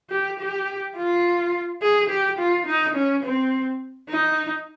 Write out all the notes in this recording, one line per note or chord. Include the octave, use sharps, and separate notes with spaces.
G4
G4
F4
G#4
G4
F4
D#4
C#4
C4
D#4